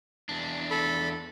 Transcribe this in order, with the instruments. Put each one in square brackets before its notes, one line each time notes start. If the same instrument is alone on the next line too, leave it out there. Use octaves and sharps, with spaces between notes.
[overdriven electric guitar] E2 D4
[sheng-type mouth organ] A4 B5